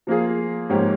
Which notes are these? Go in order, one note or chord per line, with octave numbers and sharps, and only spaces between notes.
F3 A#3 F4 G#4
G#2 F3 A#3 C#4 G4